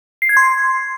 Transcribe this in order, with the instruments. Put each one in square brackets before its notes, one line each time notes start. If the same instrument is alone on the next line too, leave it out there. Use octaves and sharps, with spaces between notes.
[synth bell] C7
G#6
C6